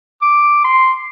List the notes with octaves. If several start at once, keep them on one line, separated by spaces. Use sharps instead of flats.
D6
C6